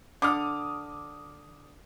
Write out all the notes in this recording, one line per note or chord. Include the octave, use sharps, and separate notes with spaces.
D3 D6 D#6 F6